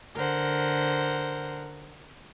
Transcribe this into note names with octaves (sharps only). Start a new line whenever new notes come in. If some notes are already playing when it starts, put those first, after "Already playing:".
D3 A#4 C5 F#5